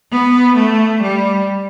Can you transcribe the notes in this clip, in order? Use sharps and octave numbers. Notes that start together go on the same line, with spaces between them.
B3
A3
G3